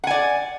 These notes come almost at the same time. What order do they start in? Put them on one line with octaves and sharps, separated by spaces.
F#5 G#5 D5